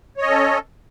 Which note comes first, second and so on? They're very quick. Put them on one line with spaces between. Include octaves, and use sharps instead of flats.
C#5 D#5 C#4 A4